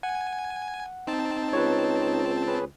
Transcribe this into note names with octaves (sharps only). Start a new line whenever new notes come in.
F#5 G#5
C4 D#4 A5
C#2 B4 C#5
C#4 G#4 B4